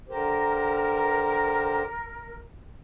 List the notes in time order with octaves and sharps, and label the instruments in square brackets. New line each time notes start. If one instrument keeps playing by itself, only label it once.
[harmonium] D3 G4 C5 [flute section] A#4